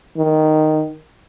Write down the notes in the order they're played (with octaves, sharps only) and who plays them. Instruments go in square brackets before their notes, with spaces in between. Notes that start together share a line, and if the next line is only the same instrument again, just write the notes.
[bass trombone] D#3